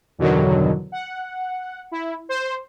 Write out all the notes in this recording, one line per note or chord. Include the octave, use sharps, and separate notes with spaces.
E2 G2 B2 D3 D#3 F#3
F#5
E4
C5